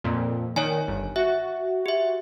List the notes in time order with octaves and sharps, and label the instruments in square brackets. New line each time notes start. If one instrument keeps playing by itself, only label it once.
[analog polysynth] F2 A#2
[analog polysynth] D#3 [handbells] C#5 D5 G#5
[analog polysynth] G1
[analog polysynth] F#4 [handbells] E5
[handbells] G4 E5